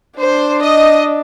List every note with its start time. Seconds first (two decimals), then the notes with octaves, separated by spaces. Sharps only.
0.19 D4 C5
0.62 D#5